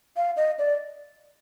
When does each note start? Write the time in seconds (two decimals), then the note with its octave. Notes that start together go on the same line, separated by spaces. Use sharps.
0.17 F5
0.37 D#5
0.59 D5